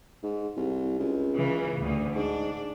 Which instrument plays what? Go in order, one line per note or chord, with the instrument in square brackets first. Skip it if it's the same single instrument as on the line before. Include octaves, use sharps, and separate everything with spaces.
[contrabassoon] G#2
C2
C#2
[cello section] C#3 E3
D2 A2
[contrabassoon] G#2 [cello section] D4